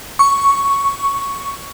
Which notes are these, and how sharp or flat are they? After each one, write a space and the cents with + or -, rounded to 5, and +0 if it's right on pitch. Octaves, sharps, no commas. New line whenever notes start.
C#6 +5